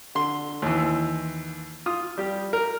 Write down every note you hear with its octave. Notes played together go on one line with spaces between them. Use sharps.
D3 C6
D#2 E3
F4 D#6
G3 G4
A#4